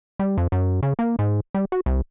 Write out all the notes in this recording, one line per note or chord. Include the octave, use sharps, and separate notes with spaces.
G3
F2
F#2
C#3
A#3
G#2
G3
F#4
C2